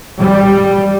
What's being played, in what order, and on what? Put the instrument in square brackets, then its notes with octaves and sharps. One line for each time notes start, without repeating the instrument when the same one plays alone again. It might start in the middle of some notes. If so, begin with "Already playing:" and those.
[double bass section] G3